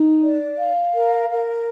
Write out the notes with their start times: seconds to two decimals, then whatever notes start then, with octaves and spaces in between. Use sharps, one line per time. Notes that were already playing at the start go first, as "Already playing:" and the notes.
Already playing: D#4
0.22 D5
0.58 F5
0.93 A#4
1.29 A#4